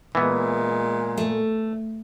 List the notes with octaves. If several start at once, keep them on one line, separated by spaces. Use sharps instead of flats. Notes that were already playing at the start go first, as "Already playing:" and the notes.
A#2 E3 G#3 B3
A3